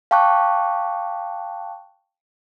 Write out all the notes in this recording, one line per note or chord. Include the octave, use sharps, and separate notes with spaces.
F5 G5 A5 C#6 D6 F#6